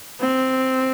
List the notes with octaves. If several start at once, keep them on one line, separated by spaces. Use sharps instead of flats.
C4